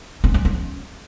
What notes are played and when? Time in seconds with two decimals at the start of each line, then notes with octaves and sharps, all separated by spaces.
0.24 C#4
0.34 F#3
0.45 C#4